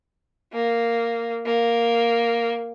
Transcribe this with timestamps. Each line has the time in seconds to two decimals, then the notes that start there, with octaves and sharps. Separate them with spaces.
0.53 A#3
1.46 A#3